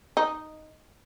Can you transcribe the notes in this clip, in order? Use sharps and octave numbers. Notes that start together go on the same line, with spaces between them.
D#4